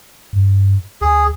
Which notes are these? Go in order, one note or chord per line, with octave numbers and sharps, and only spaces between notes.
G2
D2 G#4